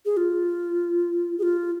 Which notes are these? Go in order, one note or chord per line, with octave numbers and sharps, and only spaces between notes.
G#4
F4
G#4
F4